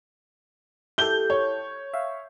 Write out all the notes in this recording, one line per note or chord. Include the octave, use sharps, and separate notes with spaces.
E4 G4 A4 G6 G7
C#5
E5 F5